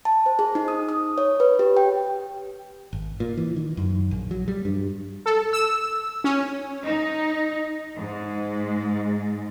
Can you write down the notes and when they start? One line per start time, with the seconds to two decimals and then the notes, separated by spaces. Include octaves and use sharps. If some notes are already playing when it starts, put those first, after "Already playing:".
0.05 A5
0.26 C5
0.39 G#4
0.55 D#4
0.68 D#6
0.89 D#6
1.18 C#5
1.40 B4
1.59 G4
1.77 G5
2.93 G#1
3.20 A#2
3.37 E3
3.56 D#3
3.77 F#2
4.11 A#1
4.31 F#3
4.48 G3
4.65 G2
5.26 A4
5.53 E6
6.24 C#4
6.85 D#4
7.97 G#2 G#3